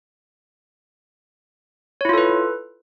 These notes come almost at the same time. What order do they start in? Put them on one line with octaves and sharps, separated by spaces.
C#5 E4 F4 A4 B4